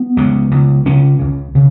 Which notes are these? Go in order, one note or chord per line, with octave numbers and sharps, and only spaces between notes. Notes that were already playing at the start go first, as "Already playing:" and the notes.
Already playing: B3
C#2 C#3
C#2 C#3
C#2 C#3 C#4
C#2 C#3
C#3